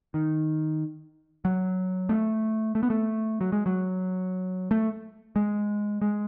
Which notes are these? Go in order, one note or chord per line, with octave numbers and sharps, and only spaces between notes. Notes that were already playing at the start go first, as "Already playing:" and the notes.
D#3
F#3
A3
A3
B3
A3
F#3
G#3
F#3
A3
G#3
G#3